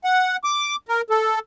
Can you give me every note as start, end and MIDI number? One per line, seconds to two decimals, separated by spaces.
0.04 0.37 78
0.44 0.76 86
0.88 1.01 70
1.10 1.39 69